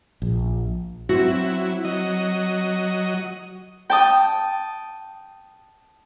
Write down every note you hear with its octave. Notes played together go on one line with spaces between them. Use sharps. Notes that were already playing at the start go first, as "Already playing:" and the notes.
A#1
F#3 C4 E4 F#4
F#3 D#5
G5 A5 D#6